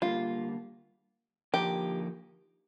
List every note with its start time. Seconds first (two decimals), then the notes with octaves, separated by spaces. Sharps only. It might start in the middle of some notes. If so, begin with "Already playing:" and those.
0.02 D3 G3 A#3 F4
1.54 D3 F3 A#3 D#4 G4 A#4